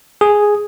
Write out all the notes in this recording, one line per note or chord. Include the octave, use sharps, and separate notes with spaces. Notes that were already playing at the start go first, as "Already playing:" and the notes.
G#4